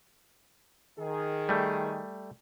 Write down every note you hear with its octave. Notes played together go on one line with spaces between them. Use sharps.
D#3 G#4
G3 A3